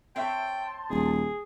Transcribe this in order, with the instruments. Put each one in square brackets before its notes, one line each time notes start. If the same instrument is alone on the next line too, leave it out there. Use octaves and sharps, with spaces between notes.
[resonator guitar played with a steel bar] C4 C#5 E5 [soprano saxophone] G5 [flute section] A5 C6
[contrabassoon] D#1 [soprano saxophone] G#4